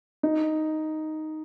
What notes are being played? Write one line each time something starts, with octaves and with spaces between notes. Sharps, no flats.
D#4